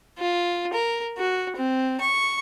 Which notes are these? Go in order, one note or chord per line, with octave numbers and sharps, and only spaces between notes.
F4
A#4
F#4
C4
C#6